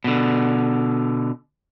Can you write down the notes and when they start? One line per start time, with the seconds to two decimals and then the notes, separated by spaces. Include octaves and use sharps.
0.04 B2 D3